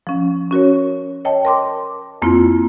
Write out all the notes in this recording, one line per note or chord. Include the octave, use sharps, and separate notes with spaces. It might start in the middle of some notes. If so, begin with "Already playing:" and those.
F3 C#4
C#4 F#4 A#4 C#5
C#5 D#5 G5 A5
A#4 C6 D6
F2 A#3 C4 E4 F4